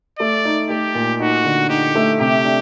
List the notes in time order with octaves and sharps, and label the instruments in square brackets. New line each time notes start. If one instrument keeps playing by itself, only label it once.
[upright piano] A3 [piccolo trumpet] D5
[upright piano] D#4
[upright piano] A3 [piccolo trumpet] G4
[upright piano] A#2
[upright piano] D#4 [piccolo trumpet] F#4
[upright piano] D3
[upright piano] D#4 [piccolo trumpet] G4
[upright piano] A3
[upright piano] C3 [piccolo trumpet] G4
[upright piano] D4